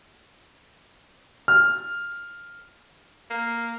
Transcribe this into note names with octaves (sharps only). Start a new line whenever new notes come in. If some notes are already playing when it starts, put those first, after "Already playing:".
F6
A#3